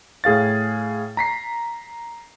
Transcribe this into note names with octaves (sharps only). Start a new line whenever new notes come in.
A2 G#4 F5 A6
A#5 B6 C7